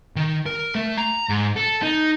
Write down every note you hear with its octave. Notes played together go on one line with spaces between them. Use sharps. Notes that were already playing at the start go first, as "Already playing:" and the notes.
D#3
A#4
A3
A#5
G#2
A4
D#4